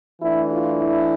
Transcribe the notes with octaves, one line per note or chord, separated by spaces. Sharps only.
E3 A3 D4 E4
F4
E4